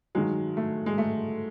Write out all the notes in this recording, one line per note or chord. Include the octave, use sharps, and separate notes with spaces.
G2 D#3 F#3 G#3
A3
G#3
A3